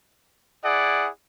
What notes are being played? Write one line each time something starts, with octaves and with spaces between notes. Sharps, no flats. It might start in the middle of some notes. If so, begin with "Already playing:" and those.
E4 G#4 D5 F#5